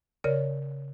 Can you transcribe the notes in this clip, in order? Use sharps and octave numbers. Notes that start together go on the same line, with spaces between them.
C#3 A#4 C#5 D5